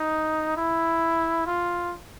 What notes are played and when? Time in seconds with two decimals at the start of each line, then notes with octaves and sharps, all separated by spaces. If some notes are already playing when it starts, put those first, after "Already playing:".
Already playing: D#4
0.57 E4
1.46 F4